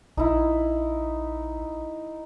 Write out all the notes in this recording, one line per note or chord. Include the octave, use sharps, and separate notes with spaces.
A#1 D#4 E4